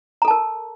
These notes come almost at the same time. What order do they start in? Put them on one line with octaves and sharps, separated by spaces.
A#5 A4 A5 A#4